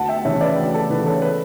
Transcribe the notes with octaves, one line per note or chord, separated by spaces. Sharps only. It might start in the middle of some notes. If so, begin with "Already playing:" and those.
Already playing: D2 F#5 A5
E5 G5
C#3 E3 C#5 E5
B4 D5
D2
A4
C#3 E3 B4
A4 C#5
B4